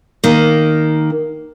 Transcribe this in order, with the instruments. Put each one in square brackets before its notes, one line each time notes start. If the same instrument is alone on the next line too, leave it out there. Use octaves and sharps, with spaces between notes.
[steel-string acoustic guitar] D#3 A#3